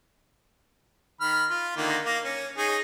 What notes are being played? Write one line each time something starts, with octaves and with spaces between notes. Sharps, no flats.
D#3 B5 F6
F4
D3 D#3 A#3
A#3
C#4
D#4 G#4 C#5